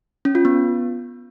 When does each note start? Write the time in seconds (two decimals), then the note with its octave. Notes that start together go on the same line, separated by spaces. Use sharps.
0.25 C#4
0.35 F4
0.45 B3